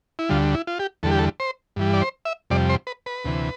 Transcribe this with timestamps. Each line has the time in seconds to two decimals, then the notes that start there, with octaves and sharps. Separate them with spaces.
0.19 E4
0.29 D2 D3 G3 F4
0.54 E4
0.67 F4
0.79 G4
1.03 E2 D3 G3 A4
1.11 G4
1.19 A4
1.40 C5
1.76 G2 E3 G3
1.94 D5
2.02 C5
2.25 E5
2.50 F2 C3 G3 D5
2.70 C5
2.87 B4
3.06 B4
3.25 D2 C3 E3